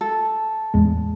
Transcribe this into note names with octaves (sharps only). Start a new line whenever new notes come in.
A4
E2 A2 G#3